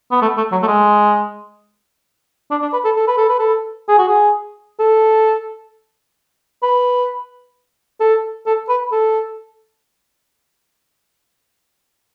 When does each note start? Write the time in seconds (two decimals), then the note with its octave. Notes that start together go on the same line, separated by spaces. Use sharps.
0.11 B3
0.22 A3
0.37 A3
0.52 F#3
0.62 A3
0.67 G#3
2.51 D4
2.62 D4
2.73 B4
2.84 A4
2.96 A4
3.07 B4
3.18 A4
3.29 B4
3.39 A4
3.88 G#4
3.98 F#4
4.08 G#4
4.79 A4
6.63 B4
8.00 A4
8.46 A4
8.69 B4
8.92 A4